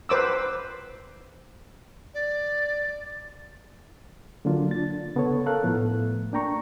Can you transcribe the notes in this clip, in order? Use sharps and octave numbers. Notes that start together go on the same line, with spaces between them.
B4 C5 D6 E6
D5
D3 F#3 A#3 D4 F4
D4 A6
C#3 B3 A4 B4 C#5
A4 A#4 F5 F#6
A2 F3 A3 B3
A#3 D4 G5 A#5 C#6